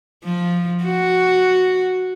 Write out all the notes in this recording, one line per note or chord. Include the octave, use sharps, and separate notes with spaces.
F3
F#4